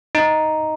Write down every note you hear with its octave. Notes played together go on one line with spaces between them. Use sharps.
D#4